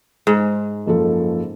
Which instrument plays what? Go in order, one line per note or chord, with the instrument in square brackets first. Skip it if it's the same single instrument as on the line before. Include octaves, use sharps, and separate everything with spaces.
[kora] G#2
[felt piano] F#1 F3 A4